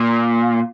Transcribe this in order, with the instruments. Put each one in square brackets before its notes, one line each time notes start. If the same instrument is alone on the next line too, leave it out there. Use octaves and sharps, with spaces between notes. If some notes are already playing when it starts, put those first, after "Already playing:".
Already playing: [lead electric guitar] A#2